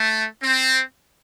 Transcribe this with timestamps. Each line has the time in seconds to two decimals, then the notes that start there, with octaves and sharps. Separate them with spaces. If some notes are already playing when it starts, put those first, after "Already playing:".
Already playing: A3
0.43 C4